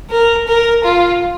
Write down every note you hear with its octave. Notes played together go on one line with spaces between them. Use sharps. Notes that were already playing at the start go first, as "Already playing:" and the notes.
A#4
A#4
F4